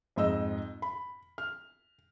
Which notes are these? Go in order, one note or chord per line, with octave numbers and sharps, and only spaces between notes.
F2 G#2 D#5 E6
B5
F6